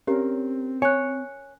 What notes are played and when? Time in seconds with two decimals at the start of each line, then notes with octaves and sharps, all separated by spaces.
0.07 C4 C#4 G4 A#4
0.82 C#5 G#5 F#6